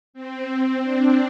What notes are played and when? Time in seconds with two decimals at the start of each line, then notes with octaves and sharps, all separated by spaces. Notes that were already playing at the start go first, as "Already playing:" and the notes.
0.14 C4
0.82 D4